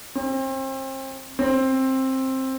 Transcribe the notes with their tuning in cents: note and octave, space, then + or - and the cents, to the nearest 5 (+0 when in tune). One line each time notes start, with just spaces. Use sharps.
C4 +35
C4 +15